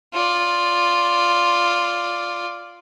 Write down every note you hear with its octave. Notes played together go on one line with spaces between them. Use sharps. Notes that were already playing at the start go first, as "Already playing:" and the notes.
F4 D5